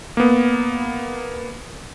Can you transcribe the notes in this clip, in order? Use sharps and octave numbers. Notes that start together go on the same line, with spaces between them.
A#3 B3